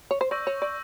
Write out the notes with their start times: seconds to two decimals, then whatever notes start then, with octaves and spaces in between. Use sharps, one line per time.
0.11 C#5
0.21 C5
0.31 D5 C#6 E6 G6 A#6
0.47 C#5
0.62 D5